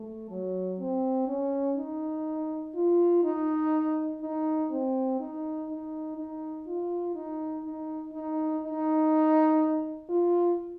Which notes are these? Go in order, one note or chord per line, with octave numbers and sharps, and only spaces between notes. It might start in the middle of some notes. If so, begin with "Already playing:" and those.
Already playing: A3
F#3
C4
C#4
D#4
F4
D#4
D#4
C4
D#4
D#4
D#4
F4
D#4
D#4
D#4
D#4
F4